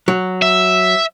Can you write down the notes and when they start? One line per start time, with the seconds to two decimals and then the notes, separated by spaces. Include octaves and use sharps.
0.08 F#3
0.42 E5